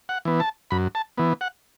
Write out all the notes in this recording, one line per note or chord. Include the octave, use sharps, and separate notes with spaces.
F#5
E3 B3
A5
F#2 B5
A5
E3 B3
F#5